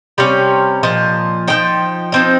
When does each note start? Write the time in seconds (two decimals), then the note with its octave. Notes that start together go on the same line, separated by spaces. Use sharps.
0.18 C3 G3 C#4 F5
0.83 A#2 F3 D#5
1.48 F3 G#3 D#4 G5
2.12 F3 C4 D#4